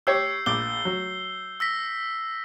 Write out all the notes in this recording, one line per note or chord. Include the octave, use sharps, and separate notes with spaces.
G4 C#5 E6 G6 C7
A#1 D6 G7
F#3
E6 A#6 B6